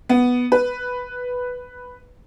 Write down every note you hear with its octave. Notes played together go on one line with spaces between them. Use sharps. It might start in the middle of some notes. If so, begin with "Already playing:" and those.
B3
B4